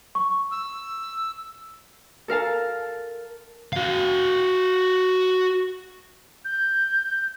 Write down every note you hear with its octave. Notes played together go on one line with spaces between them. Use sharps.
C#6
E6
A4 A#4 F5 A5
F#4 F5
G6